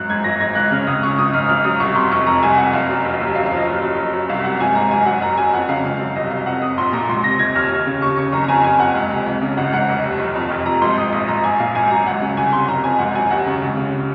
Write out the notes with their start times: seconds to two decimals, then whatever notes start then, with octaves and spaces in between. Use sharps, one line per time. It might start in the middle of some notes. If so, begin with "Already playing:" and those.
Already playing: G#1 F#2 F#6
0.09 G#2 G#6
0.24 G#1 A#6
0.40 G#2 G#6
0.55 C#2 F#6
0.71 C#3 F6
0.87 C#2 D#6
1.03 C#3 C#6
1.17 G#1 D#6
1.33 G#2 F6
1.49 G#1 F6
1.64 F#2 D#6
1.80 C2 C#6
1.95 C3 C6
2.11 F1 C#6
2.26 F2 A#5
2.42 C2 G#5
2.58 C3 F#5
2.73 F#1 F5
2.89 F#2
3.05 F1
3.21 D#2
3.35 F#2 F5
3.46 F5
3.51 F3
3.57 D#5
3.67 F#1
3.82 F#2
3.98 F#1
4.13 F#2
4.29 C2 F5
4.44 C3 F#5
4.60 G#1 G#5
4.75 G#2 A#5
4.91 F#1 G#5
5.06 F#2 F#5
5.21 F#1 A#5
5.37 F#2 G#5
5.53 F2 F#5
5.69 C#3 F5
5.84 G#1
5.99 F#2
6.15 C2 D#5
6.30 C3 F5
6.46 F2 F#5
6.61 C3 D#6
6.77 A#1 C6
6.93 A#2 A#5
7.08 C#2 C6
7.24 C3 A#6
7.39 F1 G#6
7.55 D#2 F6
7.71 D#2
7.86 C#3
8.02 D#2 C#6
8.17 C#3 C#6
8.32 F#1 A#5
8.44 A#5
8.48 F2 G#5
8.64 F#1 G#5
8.79 F2 F#5
8.95 C#2
9.11 C3
9.26 C#2
9.42 C#3
9.57 G#1 F#5
9.73 G#2 F#5
9.89 F1
10.04 D#2
10.19 F#1
10.35 F2
10.50 F1
10.65 F2 A#5
10.81 G#1 C6
10.97 G#2 D#6
11.12 A#1 D#6
11.28 G#2 A#5
11.43 A#1 G#5
11.60 A#2 F5
11.75 G#1 G#5
11.90 F#2 A#5
12.06 C#2 F#5
12.21 C#3
12.37 C2 G#5
12.52 C3 C6
12.68 F#1 A#5
12.84 F2 G#5
12.99 G#1 F#5
13.15 F#2 G#5
13.30 D#2 F#5
13.46 C#3
13.62 C#2
13.77 C#3